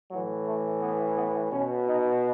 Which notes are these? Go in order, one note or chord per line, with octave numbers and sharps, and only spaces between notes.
A2 E3 F#3
A3
B3
B3
B2 C#4
D#4